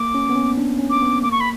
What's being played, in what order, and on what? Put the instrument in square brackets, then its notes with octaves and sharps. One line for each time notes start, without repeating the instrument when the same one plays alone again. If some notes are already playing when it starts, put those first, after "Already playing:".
Already playing: [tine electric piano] A#3 [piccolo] D6
[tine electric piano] C#4
B3
C#4
D4
C#4
[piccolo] D6
[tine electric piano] B3
[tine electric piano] A#3 [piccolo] D6
[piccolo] C#6
B5